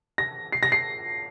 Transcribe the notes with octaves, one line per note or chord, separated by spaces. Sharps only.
A#6
C7
A#6
C7